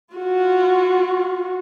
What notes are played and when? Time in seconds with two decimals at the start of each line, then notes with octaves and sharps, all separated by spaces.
0.14 F4 F#4